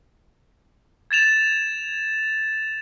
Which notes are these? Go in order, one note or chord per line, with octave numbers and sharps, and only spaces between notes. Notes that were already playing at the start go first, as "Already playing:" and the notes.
G#6 A6 E7 F7